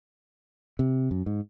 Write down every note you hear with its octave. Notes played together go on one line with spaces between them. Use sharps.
C3
F#2
G#2